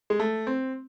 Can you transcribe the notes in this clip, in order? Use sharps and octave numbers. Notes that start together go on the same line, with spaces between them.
G#3
A3
C4